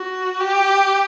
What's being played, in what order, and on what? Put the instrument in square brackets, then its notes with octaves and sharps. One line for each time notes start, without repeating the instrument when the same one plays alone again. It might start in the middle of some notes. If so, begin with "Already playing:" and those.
Already playing: [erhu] F#4
G4